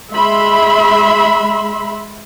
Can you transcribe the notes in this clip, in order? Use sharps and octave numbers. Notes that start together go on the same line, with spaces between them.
G#3 E5 B5 C6